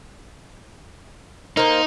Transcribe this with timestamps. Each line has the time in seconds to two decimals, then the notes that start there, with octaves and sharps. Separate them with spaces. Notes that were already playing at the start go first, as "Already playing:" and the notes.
1.57 A#3 D#4 C5